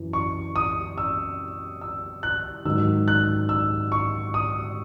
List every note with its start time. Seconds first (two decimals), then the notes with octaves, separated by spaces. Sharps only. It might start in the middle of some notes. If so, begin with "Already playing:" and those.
Already playing: F#2 E3
0.13 C#6
0.56 D#6
0.98 E6
1.81 E6
2.23 F#6
2.65 G#2 D#3 F#3 E6
3.08 F#6
3.49 E6
3.92 C#6
4.34 D#6